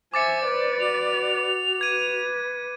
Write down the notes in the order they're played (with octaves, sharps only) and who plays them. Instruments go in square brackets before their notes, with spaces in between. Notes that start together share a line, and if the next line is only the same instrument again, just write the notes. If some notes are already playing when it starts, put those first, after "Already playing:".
[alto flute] C5 [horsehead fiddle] E5 G#5 [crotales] D6 A6 C#7
[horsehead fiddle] B4 D5
[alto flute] F#4 [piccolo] F7
[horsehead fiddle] B4 [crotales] G#6 D#7